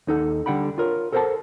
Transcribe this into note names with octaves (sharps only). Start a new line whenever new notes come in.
D#2 D#4 A4 F#5
D3 G3 F#5 G5 B5
F4 A#4 C#5
A4 A#4 C5 D#5 F#5 A5